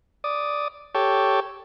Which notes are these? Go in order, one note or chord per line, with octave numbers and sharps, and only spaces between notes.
D5 D#6
G4 A4 C#5